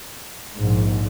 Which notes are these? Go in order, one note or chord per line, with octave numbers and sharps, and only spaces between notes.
A#1 G#2